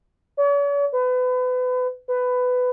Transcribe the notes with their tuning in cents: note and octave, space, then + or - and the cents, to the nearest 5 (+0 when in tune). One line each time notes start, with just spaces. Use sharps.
C#5 +45
B4 +30
B4 +15